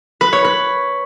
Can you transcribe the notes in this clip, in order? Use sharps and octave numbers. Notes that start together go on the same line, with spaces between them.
B4
C#5
B4